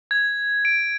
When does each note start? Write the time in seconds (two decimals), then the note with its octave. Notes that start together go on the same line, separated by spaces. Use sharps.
0.11 G#6
0.65 D7